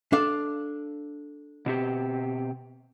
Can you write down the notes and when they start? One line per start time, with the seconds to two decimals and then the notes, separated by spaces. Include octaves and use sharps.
0.13 D4 A4 F5
1.66 B2 C4 G4